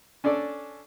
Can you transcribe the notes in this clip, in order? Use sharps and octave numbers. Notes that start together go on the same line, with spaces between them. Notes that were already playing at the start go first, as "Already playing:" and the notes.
C#4 D4 A4 D5